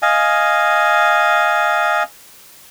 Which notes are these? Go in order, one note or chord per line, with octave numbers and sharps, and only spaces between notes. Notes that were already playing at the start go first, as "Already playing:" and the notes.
D#5 F5 G#5